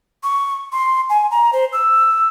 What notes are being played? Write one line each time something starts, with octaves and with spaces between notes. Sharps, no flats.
C#6
C6
G#5
A#5
C5
E6